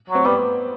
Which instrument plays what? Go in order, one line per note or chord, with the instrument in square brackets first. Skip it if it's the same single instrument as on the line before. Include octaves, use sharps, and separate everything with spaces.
[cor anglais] F#3
[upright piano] C4
[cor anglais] G3 [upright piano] B3